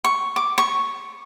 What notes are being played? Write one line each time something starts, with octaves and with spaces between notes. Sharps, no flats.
C#6
D6
C#6